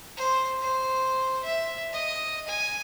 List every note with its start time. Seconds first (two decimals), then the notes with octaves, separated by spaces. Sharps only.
0.17 C5
0.62 C5
1.43 E5
1.93 D#5
2.48 G#5